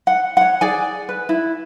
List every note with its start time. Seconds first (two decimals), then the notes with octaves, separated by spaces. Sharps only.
0.07 F#5
0.37 C#5 F#5
0.61 G#4 D5 G#5
1.09 B4
1.29 E4